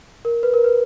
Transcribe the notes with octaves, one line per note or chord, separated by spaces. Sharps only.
A#4
B4
A#4
B4